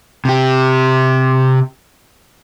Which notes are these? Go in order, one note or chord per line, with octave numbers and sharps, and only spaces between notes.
C3 G4